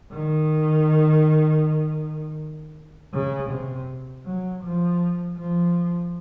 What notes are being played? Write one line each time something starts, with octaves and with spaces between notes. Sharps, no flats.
D#3
C#3
C3
F#3
F3
F3